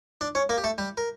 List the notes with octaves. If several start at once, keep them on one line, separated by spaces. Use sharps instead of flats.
D4 D5
C#4 C#5
A#3 A#4
G4
A3 A4
G3 G4
A#4